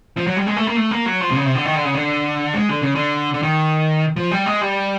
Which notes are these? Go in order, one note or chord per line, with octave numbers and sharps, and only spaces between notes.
F3
F#3
G3
G#3
A3
A#3
A3
A#3
F#3
F3
C3
C#3
C3
D3
D#3
D3
C#3
D3
G#3
D3
C#3
D3
D3
D#3
F3
G3
G#3
G3